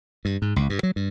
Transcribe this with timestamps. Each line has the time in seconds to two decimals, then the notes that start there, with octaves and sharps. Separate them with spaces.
0.25 G2
0.42 G#2
0.56 C#2
0.70 G2
0.83 F#3
0.96 G2